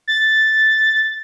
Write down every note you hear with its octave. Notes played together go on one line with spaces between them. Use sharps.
A6